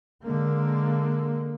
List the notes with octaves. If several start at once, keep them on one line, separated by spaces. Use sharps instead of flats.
D3 G#3 A#3